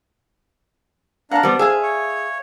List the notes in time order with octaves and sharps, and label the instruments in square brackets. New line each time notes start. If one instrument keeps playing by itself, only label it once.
[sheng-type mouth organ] D4 F5 A#5 [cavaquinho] F#5 A5
[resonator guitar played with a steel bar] G3 B3 [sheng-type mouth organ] C5
[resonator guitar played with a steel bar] G#4 [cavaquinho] E5 F5 G#5
[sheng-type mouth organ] C#5